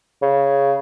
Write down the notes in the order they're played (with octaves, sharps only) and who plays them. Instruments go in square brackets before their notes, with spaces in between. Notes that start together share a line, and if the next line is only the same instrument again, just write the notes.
[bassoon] C#3